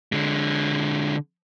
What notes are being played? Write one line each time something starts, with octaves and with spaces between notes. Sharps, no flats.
D3 G#3